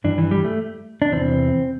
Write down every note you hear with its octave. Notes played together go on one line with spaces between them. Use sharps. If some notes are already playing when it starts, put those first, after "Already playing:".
G2 E3 D4
E3
G3
A3
D4
E2 C3 E3 C4